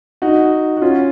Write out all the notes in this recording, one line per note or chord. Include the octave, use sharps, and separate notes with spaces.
D#4 F#4
F#4
C#4 F4